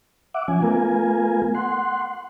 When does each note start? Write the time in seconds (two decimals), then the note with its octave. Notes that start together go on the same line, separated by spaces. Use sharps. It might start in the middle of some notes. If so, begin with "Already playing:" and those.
0.34 E5 F#5 D6
0.48 F3 C#4 G#5
0.62 A3 B3 F4 A#4 G#5
1.55 F#5 C6